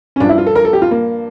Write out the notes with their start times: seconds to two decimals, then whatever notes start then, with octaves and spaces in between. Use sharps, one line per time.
0.16 C#4
0.20 G2 F3 D4
0.29 E4
0.38 F4
0.46 A4
0.55 A#4
0.65 A4
0.73 G4
0.82 F4
0.91 A#3